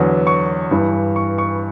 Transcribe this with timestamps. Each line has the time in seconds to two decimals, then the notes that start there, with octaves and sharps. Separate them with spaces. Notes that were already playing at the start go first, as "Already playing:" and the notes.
Already playing: E2 D3 F#3
0.27 C#6
0.71 G2 E3
1.16 C#6
1.38 C#6